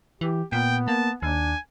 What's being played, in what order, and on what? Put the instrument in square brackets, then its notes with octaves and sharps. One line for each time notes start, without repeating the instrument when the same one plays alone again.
[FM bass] E3 [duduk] G4
[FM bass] A#2 [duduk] B3 [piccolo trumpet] G5
[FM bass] A#3 [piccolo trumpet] A5
[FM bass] D#2 [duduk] D4 [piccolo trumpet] G#5